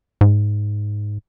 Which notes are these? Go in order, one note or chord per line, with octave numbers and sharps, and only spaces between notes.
G#2